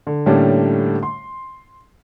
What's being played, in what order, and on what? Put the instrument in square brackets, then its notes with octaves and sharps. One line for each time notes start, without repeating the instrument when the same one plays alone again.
[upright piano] D3
A2 D3 G3 A#3 C#4 D4
C6